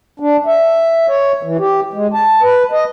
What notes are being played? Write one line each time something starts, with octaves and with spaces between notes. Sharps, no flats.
D4
E5
C#5
E3
G4
G#3
A5
B4
D#5